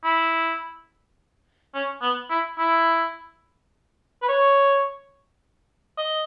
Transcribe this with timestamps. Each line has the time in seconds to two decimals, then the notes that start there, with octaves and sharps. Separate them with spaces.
0.04 E4
1.74 C#4
2.02 B3
2.30 E4
2.59 E4
4.22 B4
4.28 C#5
5.98 D#5